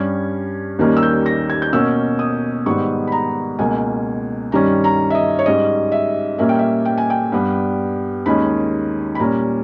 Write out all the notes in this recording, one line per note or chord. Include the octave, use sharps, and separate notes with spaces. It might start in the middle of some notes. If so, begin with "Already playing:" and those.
Already playing: G2 G3 C#4 G#6
D#2 D#3 G3 A#3 C#4
E6
G6
A#6
G#6
G6
B2 A#3 C#4 E6
D#6
G#2 D#3 G3 B3 C#6
B5
A#5
C#2 B2 A#3 G#5
G2 D#3 G3 C#4 A#5
A#5
E5
D#5
C#5
G#2 G3 C#4 D#5
E5
A#2 G3 A#3 C#4 E5
G5
E5
G5
G#5
G5
G2 G3 B3
D#2 D#3 G#3 C#4 B5
B5
A#2 G3 C#4 A#5